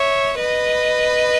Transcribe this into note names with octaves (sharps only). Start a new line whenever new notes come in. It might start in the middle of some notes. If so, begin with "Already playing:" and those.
Already playing: C#5 E5
B4 D#5